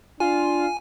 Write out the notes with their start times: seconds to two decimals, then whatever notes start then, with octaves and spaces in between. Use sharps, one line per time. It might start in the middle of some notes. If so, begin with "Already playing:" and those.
0.20 D4 F4 G#5